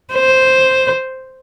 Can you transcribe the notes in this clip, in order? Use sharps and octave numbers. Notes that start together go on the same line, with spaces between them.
C5